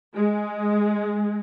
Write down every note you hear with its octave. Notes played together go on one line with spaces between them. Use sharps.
G#3